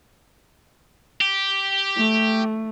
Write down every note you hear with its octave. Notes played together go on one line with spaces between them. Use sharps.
G4
A3